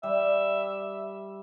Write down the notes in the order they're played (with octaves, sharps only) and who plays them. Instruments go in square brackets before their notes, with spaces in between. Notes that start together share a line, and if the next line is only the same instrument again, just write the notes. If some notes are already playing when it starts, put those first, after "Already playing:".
[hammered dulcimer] G3 [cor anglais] E5